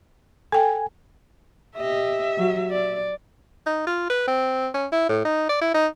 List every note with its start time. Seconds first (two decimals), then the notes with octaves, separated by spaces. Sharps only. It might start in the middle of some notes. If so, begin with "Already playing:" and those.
0.52 A4 G5 G#5
1.75 G4 D#5 E5
2.38 F#3 F#4
2.71 D5
3.67 D#4
3.87 F4
4.10 B4
4.28 C4
4.74 C#4
4.92 E4
5.09 A2
5.25 D#4
5.49 D5
5.61 E4
5.74 D#4